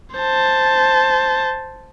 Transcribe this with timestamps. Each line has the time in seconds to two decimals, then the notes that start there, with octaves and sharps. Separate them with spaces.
0.16 C5 A5